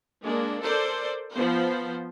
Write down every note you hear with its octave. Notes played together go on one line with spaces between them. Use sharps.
G#3 A#3 D4
A4 A#4 C5 D5
F3 B3 C5